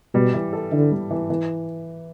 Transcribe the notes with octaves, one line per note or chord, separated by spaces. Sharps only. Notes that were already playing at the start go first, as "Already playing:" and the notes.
B2 G3
E3
A4
D3 E4
G3
E3
E3